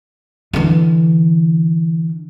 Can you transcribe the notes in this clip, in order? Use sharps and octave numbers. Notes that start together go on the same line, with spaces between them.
D3 E3